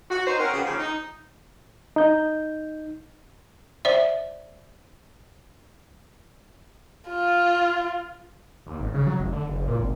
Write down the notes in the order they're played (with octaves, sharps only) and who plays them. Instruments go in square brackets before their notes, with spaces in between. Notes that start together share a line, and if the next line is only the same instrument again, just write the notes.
[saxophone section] F#4
D#4 C5
C4 C#4 F#4 A#4
C#3 F3 B3 G4 G#4
D#2 C#3 F3 G#4 C#5
D#4
[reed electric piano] D#4 G6
[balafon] C5 D5 E5
[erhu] F4
[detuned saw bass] D#2
G#1
C#3
F#3
F1
D3
F#1
A#2
G#1